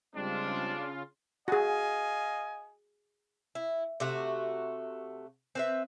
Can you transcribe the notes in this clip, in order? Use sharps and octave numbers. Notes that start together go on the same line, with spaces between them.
C#3 G3 G#3 C4 D4 F4
F#4 G#4 D#5 F5 G#5
E4
C3 A3 F#4
C4 B4 E5